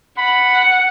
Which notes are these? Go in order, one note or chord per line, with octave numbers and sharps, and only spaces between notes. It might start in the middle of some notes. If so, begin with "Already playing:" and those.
F#5 B5